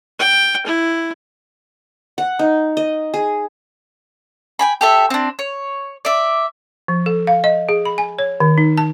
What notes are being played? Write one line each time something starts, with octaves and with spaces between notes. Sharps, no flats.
G5
E4
F#5
D#4
D#5
G#4
G5 G#5 B5
G4 A4 E5
C4 D4
C#5
D5 E5
F3
A4
F5
D#5
G#4
B5
G#5
C#5
D#3
D#4
A5